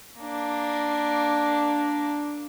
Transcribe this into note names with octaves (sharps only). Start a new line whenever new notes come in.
A#3 D4